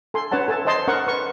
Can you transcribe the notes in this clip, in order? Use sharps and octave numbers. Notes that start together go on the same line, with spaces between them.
A4 G#5 C6
C#4 B4 C#5 F#5 A5
A4 G#5 A5
C5 C#5 D#5 A5 C6
C#4 A#4 F#5 C#6
B4 C#6